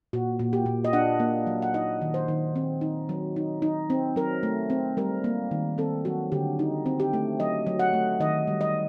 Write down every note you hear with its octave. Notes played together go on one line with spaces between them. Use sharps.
A#2 F#4
A#2
G4
A#2
D#5
D4 F#5
A#3
F#3
F#5
D#4 D#5
D#3
C5
D#3
C4
D#4
F#3
D#4
D#4
C4
F#3 A#4
A3
C4
G3 A#4
A#3
D#3
C4 A4
F#3 F#4
D3 G4
D#4
C4
G4
A3
F#3 D#5
F#3
F#5
A3
D#3 D#5
G3
D#5